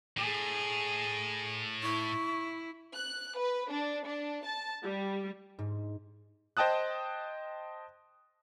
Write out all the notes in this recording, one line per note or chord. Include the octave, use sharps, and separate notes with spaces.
A2 G#4
E4 C#6
F#6
B4
D4
D4
A5
G3
G#2
C5 D#5 G5 A5 D#6 F#6